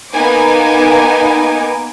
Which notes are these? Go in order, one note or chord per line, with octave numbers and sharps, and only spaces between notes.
A#3 B3 D#4 G#5 D6